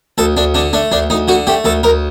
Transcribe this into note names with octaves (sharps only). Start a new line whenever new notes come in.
D2 A4
D2 D4
D3 D4
A3 D4
D2 D4
D2 D#4
D3 F#4
A3 G4
D2 A4
D2 A#4